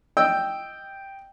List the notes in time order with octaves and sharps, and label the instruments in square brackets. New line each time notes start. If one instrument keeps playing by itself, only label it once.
[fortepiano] D#5 G5 E6